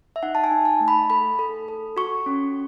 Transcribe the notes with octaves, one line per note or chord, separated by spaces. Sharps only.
E5
D#4 F#5
A5
G#5
D#4
A5
A3
B5
A4 B5
A4
A4
F#4 C#6
C#4